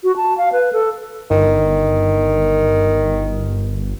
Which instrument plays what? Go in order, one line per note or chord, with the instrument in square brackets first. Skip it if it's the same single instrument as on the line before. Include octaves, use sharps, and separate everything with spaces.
[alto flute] F#4
A5
F5
B4
A4
[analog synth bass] G1 [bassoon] D#3